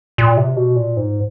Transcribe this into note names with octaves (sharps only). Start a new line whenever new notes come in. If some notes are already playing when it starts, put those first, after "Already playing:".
A#2
C3
B2
A#2
G#2